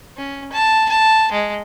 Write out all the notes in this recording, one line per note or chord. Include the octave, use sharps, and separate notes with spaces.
C#4
A5
A5
G#3